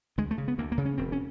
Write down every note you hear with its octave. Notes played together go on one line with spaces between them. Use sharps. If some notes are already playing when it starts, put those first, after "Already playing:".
D2 G#3
A3
C#3
B3
D2 A#3
A#3
C#3
C#4
E1 C4
C#4